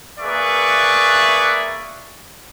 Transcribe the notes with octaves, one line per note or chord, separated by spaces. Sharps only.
A#3 G#4 B4 D5 E5 C#6